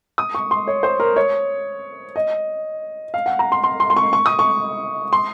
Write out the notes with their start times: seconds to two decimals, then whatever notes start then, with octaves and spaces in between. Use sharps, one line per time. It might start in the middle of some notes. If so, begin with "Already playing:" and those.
0.18 D#6
0.35 C#6
0.51 C6
0.68 C#5
0.83 C5
1.00 A#4
1.16 C#5
2.16 D#5
3.14 F5
3.26 F#5
3.39 A#5
3.52 C6
3.64 C6
3.80 C6
3.90 C6
3.96 C#6
4.13 C#6
4.26 D#6
4.39 C#6
5.13 C6